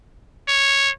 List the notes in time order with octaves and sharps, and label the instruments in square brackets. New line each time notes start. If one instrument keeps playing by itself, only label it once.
[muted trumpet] C#5